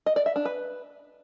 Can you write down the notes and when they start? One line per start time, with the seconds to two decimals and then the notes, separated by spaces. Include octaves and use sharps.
0.06 D#5
0.16 D5
0.26 E5
0.36 D4
0.45 B4